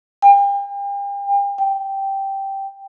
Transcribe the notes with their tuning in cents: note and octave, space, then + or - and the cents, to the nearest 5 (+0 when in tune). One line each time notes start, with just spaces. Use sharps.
G5 +40
G5 -5